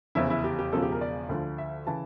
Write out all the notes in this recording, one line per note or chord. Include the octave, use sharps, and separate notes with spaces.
F1 E2 C#3 E3 E4
E4
G4
G4
E1 E2 C#3 F3 A4
G4
A#4
D5
D2 D3 F3
E5
C#3 E3 A5